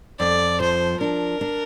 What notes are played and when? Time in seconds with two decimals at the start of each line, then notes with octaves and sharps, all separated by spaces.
0.19 F2 D5
0.60 F3 C5
1.00 D4 A#4
1.41 D4